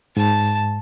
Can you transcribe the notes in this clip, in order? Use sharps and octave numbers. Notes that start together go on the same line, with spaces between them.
G#2 A5